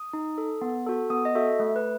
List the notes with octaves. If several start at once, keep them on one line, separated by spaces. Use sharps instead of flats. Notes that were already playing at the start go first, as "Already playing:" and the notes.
Already playing: D#6
D#4
A4
B3
F#4 A4
B3 D#6
D#5
F#4 A4 E5
A3
B4